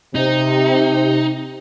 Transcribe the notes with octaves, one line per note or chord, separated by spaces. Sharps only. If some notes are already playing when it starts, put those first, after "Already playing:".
C3 D#4